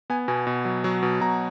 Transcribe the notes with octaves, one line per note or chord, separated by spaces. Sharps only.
B3 G#5
B2 G#5
B2
F#3
F#3
B2
B2 A#5